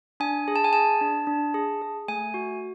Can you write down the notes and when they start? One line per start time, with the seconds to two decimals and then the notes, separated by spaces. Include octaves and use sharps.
0.20 D4 G#5
0.48 G#4
0.56 A5
0.64 G#5
0.73 G#4 A5
1.01 D4
1.27 D4
1.54 G#4
1.82 G#4
2.08 A3 G#5
2.34 F#4